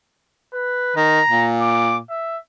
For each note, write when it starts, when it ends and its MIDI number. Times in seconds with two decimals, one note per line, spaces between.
0.53 0.93 71
0.96 1.20 51
0.96 1.49 82
1.29 2.00 46
1.60 1.97 86
2.10 2.37 76